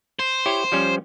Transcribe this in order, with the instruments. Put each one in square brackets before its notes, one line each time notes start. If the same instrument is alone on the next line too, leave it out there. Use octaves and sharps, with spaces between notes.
[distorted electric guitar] C5
[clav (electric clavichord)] E4 G4 C#5
F3 G3 C#4